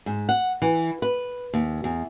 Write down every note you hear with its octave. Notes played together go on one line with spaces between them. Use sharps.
G#2
F#5
E3
B4
D#2
E2